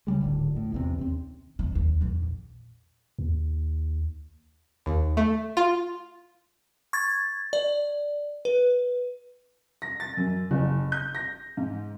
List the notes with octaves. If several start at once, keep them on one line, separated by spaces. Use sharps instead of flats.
C#3 E3 G3 G#3
D1 G#1 D3
A2
A#1 E2 C3
D#2 C4
C3
D#2
A#1 E2
D#2
D#2
A3
F4
C#6 G#6 A6
D5
B4
A#6
A6
F#2
F#1
G6
A#6
G#2